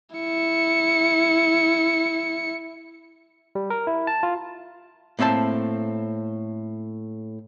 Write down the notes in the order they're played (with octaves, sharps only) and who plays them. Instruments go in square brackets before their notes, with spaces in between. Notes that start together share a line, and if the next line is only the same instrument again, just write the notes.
[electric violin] E4 C#7
[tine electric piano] G3
A#4
E4
A5
F4
[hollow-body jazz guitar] A2 A#3 C4 E5 A5